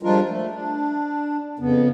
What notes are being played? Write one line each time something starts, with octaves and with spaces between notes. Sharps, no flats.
F3 G3 G#3 D4 F4 A#4
A3
D4
F2 C#3 B3